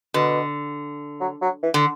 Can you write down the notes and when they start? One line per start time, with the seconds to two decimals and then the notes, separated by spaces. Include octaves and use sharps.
0.14 B2 D3
1.21 F#3
1.42 F#3
1.63 E3
1.74 D3